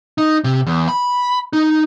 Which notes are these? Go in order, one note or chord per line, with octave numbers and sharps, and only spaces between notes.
D#4
C3
E2
B5
D#4